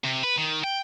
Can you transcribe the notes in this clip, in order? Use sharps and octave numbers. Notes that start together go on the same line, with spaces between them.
C3
B4
D#3
G5